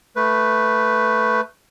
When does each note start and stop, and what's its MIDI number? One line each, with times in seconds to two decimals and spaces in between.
0.16 1.41 57
0.16 1.41 71